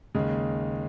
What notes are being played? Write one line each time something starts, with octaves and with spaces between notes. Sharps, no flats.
D#2 C#3 G#3